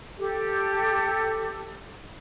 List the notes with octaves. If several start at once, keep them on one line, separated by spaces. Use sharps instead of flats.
G4 A4